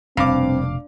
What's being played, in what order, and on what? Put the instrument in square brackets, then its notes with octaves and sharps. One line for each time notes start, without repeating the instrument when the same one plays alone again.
[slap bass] F1 B2 [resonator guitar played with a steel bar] G2 [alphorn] C4 [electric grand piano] F5 D6